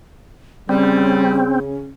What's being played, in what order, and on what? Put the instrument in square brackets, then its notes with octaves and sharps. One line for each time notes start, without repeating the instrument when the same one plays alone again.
[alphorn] C#3 [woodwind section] G3 [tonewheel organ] C4 [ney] C#4